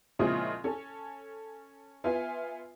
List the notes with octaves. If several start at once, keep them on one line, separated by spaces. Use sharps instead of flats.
A#2 C#3 F3 G#3 C4 E4
C#4 A4
B3 F4 E5 G#5